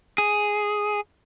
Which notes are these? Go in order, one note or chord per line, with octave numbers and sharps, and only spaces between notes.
G#4